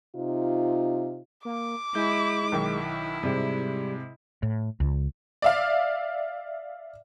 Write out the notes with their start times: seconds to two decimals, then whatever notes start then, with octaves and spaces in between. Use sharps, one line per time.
0.15 C3 D#4 F4
1.45 A#3 D6
1.95 G#3 E4 G6
2.52 B1 D#3 E4 G5
3.23 G#2 C3 G3 G#3
4.43 A2
4.80 C#2
5.42 D5 E5 F5